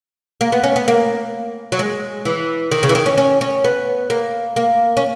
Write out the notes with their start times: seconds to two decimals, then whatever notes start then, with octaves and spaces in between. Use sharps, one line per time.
0.41 A#3
0.52 B3
0.63 C#4
0.76 B3
0.88 A#3
1.72 F#3
1.79 G#3
2.25 E3
2.71 D#3
2.83 C#3
2.89 E3
2.95 D#3
3.06 C#4
3.18 C#4
3.41 C#4
3.64 B3
4.10 A#3
4.56 A#3
4.97 C#4